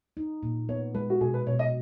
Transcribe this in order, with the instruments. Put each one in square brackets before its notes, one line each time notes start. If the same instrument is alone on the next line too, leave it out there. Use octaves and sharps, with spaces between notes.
[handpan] D#4
A#2
[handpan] B3 [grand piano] C#5
[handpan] G#3 [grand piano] B4
[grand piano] F#4
[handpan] B2 [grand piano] G#4
[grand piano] B4
[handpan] B2 [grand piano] C#5
[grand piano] D#5